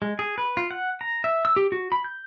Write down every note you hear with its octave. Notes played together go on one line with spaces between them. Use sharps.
G#3
G#4
B4
F4
F#5
A#5
E5
E6
G4
F#4
B5
G6